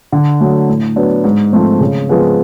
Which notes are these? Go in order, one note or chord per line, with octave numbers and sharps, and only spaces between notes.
D3
F#3 A3
A2
F#3 B3 D4
G#2
F3 A3 C4
C#3
F3 G#3 B3